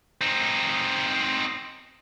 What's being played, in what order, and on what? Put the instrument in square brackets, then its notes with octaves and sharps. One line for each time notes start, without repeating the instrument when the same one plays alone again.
[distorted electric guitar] C4 D#4